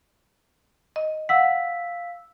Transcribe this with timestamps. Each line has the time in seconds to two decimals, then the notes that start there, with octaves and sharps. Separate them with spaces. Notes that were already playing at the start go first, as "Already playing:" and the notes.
0.96 D#5
1.29 F5 F#5 E6 B6